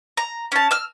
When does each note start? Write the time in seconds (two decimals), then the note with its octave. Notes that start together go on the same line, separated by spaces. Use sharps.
0.17 A#5
0.52 C#4 A5
0.71 E6 F6